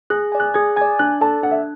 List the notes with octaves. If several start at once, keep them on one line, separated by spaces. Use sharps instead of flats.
G#4 F#6
D5 G#5
F#6
G#4 G#6
D5 G#5 G#6
D4 F#6
A4 D5 A5
D4 F#5
E5